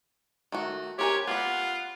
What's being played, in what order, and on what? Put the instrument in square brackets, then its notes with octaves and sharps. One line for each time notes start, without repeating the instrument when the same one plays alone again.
[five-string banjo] D#3 A3 F#4
[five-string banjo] C4 A#4 G#5 [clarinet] G4 [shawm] C#5
[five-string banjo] B3 B5 [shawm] F4 [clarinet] F#5